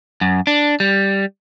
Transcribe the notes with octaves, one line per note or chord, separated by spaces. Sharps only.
F#2
D4
G3